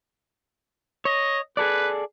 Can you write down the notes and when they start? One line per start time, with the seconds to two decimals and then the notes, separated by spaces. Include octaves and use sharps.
1.05 C#5 D#5
1.57 G#4 A4 B4 D5